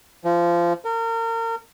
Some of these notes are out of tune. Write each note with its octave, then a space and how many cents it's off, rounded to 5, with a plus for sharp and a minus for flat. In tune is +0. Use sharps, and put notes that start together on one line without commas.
F3 -20
A#4 -35